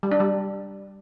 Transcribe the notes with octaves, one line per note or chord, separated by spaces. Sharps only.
G3
D4
G3